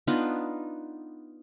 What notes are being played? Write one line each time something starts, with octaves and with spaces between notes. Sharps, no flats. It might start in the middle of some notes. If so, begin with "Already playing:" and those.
B3 D4 D#4 F4